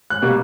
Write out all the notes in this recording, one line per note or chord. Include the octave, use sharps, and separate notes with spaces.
F#6
B2 G3 A#3